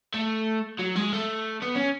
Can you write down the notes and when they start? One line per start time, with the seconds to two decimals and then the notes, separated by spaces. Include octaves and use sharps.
0.14 A3
0.79 F#3
0.96 G#3
1.13 A3
1.62 B3
1.75 C#4